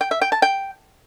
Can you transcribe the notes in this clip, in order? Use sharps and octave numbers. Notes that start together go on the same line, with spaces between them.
G5
E5
G5
A5
G5